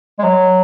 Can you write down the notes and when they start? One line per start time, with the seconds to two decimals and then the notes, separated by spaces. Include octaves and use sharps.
0.19 G#3
0.24 F#3